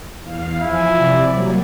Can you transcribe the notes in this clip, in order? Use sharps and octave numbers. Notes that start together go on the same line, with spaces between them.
E2 F5
F3 E4 G#5
C3 D5
F#3 G3 A#3